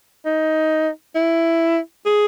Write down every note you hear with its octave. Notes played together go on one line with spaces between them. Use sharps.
D#4
E4
G#4